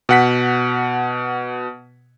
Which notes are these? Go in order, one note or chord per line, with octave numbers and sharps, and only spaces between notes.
B2 F#5 B6